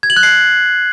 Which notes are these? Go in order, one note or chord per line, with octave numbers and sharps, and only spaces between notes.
G#6
F#7
F#6
C7